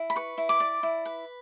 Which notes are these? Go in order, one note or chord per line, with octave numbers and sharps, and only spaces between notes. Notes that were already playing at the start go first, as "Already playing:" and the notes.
Already playing: E4
B5
B4 C#6
E4
D6
D5
E4
B4